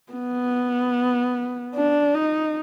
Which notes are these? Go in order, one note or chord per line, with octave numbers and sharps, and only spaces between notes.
B3
D4
D#4